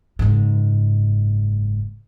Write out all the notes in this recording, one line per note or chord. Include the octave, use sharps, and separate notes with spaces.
F#1 G#2